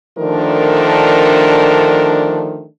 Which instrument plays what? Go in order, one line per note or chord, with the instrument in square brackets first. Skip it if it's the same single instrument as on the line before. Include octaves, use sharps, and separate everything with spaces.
[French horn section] D3 D#3 F3 A3 D4 A#4